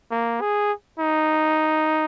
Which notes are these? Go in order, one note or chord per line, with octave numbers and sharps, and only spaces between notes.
A#3
G#4
D#4